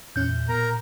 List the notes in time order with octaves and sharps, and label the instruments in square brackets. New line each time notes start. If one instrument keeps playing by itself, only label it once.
[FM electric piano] E2 C#4 F#6 [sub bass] A#2 [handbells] G6
[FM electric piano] E2
[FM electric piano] B2 [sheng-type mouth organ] A#4 A#5